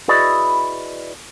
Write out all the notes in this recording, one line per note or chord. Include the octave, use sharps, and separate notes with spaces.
E4 F#4 G#4 B4 D5 D#5